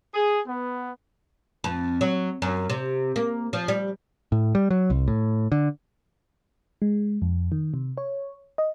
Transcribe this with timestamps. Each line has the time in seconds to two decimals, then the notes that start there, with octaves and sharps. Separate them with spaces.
0.14 G#4
0.47 B3
1.64 F2
2.01 F#3
2.42 F#2
2.70 C3
3.16 A#3
3.53 F3
3.68 G3
4.32 A2
4.55 G3
4.70 F#3
4.90 C2
5.08 A2
5.52 D3
6.82 G#3
7.22 F2
7.52 D#3
7.74 C3
7.97 C#5
8.58 D#5